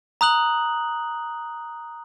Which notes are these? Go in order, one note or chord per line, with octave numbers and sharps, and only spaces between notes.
A#5 D#6 F#6 F#7